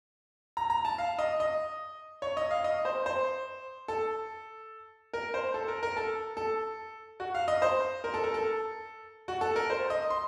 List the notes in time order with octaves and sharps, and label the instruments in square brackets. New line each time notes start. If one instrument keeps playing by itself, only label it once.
[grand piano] A#5
A#5
A5
F5
D#5
D#5
C#5
D#5
F5
D#5
C5
C5
A4
A#4
C5
A4
A#4
A#4
A4
A4
F#4
F5
D#5
C5
A#4
A4
A#4
A4
F#4
A4
A#4
C5
D#5
C6